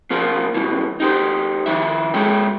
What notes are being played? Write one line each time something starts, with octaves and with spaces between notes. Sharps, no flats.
B2 F3 A#3 F4
G2 B2 E3
D#4 G4 C5
D#3 F3 E5
G#3 C#5 E5 G5